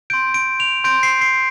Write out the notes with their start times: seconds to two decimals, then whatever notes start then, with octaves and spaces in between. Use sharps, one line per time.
0.10 C6 G6 D7
0.34 D7
0.60 F7
0.84 C6 G6 D7
1.03 C7
1.21 C7